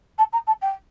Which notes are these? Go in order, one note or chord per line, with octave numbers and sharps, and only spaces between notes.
A5
A#5
A5
G5